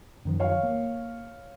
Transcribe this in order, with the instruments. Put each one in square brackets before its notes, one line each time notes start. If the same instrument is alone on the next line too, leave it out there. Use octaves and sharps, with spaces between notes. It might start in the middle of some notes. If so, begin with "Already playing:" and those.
[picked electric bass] F#2 D#3 F3
[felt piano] C#5 F5
[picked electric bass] A#3